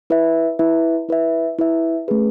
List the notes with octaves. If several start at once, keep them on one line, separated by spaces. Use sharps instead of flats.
E4 B4 E5
E4 B4 E5
E4 B4 E5
E4 B4 E5
A3 C#4 G#4 B4